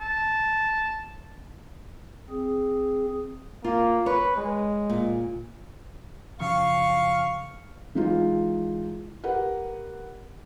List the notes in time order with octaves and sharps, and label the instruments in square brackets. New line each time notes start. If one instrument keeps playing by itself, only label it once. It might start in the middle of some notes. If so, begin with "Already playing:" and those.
[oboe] A5
[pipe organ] C4 G#4
[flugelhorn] A#3 [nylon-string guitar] F4
[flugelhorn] B4 [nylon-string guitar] C#5
[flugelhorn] G#3
[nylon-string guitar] A#2
[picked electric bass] F#1 C#3 F3 [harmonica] F5 [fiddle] C#6
[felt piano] E3 G#3 D#4 F4
G4 A#4 B4 F#5